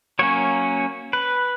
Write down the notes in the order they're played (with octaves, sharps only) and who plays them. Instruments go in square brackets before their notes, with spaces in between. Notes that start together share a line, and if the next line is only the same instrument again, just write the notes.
[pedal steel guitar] F#3 A#3 C#4 C#5
B4